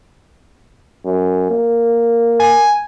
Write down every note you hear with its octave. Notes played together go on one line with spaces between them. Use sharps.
F#2
A#3
G#5